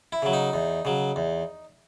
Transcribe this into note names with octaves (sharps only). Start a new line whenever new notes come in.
E4
C#3 F#3
D#4
E2
C#3 F#3
E2